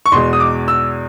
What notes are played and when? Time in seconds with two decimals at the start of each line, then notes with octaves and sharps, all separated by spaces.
0.06 C#6
0.12 E2 B2 G#3 C6
0.33 D#6
0.40 D6
0.68 E6